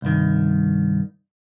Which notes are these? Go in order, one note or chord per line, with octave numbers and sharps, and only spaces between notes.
C2 G2 D#3